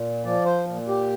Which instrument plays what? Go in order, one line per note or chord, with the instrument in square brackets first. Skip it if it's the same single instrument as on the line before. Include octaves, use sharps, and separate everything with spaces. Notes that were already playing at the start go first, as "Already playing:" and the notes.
Already playing: [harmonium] A#2
F3 D5
C5
A#2
G4